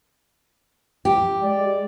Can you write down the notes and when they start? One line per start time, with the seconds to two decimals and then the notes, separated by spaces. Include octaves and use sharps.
1.05 G4
1.43 G#3 D5